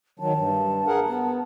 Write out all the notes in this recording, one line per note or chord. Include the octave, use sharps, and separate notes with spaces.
D#3 F#3 A5
G2
G#4 A#4 F#5
B3